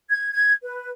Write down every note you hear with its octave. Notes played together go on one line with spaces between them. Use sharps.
G#6
G#6
B4